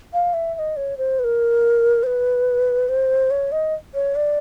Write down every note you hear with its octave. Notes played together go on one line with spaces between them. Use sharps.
F5
E5
E5
D#5
C#5
C5
B4
A#4
C5
B4
C5
C#5
D#5
C#5
D5